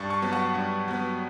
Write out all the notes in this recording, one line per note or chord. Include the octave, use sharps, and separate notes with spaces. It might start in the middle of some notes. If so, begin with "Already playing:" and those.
Already playing: G2 A5 C#6
A5 C#6
F#3 B3
F#5 A5
G2
F#3 B3